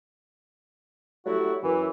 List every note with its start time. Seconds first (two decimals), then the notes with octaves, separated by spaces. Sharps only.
1.26 F#3 G3 A3 E4 F#4
1.63 F#2 E3